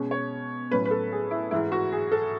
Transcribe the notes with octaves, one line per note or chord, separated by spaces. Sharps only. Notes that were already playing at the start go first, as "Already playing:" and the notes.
Already playing: B2 G#3 C#4
C#5
A2 F#3 C#4 B4
B4
A4
G#4
E4
G#2 E3 G#3 E4
F#4
G#4
A4